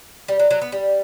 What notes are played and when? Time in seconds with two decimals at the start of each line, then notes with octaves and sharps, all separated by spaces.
0.28 G3
0.39 F#3
0.51 F#3
0.61 B3
0.72 G3